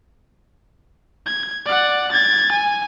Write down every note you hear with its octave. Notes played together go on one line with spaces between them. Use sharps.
G#6
D5 F#5
G#6 A6
G#5